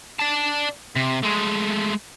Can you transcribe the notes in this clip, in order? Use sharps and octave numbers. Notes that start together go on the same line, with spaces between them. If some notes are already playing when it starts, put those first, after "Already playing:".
D5 A5
C3
G#3 A3